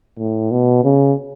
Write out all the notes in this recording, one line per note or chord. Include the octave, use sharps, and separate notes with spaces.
A2
B2
C#3